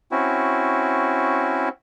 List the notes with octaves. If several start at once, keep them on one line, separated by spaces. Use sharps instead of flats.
C4 C#4 E4 F#4